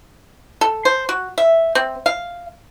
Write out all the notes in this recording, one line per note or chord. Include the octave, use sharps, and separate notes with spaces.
A4
C5
F#4
E5
C4
F5